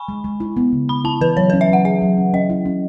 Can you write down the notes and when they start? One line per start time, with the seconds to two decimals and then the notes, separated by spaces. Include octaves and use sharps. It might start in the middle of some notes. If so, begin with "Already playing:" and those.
Already playing: G#5 B5 C#6
0.08 G#3
0.24 G#3
0.40 E4
0.57 B3
0.72 C#3
0.89 B3 B5
1.04 E4 A5
1.21 E3 B4
1.37 F#3 C#5
1.50 B4
1.53 C#4
1.61 E5
1.69 F#3 F#5
1.85 G#4 E5
2.02 F#3
2.17 C#4
2.34 C#4 D#5
2.50 E4
2.65 C#4